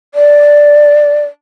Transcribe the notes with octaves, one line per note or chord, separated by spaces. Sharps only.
D5